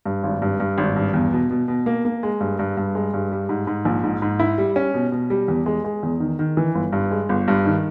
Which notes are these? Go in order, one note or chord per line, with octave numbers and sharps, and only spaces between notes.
G2
G#1
G2
G2
G#1
G2
E2
B2
B2
B2
A#3
A#3
G#3
G2
G2
G2
G#3
G2
G3
G#2
G#2
A#1
G#2
G#2
E4
G3
C#4
B2
B2
G3
E2
G#3
G#3
E2
D#3
D#3
E3
G1
G2
G#3
G1
G2
D#3